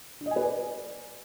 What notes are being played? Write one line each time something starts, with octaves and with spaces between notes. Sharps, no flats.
D4
D#5
G#5
B4
D5